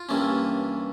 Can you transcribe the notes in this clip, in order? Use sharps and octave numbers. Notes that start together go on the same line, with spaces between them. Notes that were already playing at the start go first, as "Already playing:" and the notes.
Already playing: F4
G2 E3 A#3 C#4